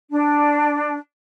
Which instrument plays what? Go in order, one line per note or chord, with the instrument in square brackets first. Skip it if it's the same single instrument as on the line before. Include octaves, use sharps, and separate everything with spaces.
[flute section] D4